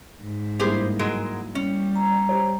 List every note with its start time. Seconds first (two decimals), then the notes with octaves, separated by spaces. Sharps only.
0.23 G#2
0.59 G2 A#3 E4 G4 G#4 C5
0.99 F#3 G#3 A#4
1.55 G3 C#4
1.96 A#5
2.29 G4 C5 C#5